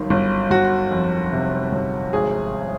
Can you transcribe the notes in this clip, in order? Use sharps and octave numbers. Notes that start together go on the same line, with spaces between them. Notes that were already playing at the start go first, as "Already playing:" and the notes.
Already playing: G1 F#2 D#3
G1
G1 F#4
F2
C3
G1
G#1 G#4